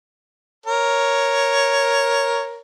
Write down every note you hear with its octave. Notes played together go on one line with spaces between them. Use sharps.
A#4 C#5